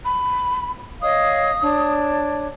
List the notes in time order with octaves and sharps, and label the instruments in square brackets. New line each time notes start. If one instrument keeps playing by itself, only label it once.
[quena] B5
[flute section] C#5 D#5 F5 [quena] D#6
[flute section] D4 C#5